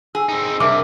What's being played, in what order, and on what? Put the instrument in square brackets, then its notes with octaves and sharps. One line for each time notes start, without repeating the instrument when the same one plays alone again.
[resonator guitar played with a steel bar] G#4 [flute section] E6
[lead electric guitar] C4 D#4
[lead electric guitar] C2 [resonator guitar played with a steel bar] G2 [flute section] A#4 E5 A5 [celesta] D6